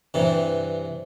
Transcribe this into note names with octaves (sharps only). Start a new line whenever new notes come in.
G2 C3 E3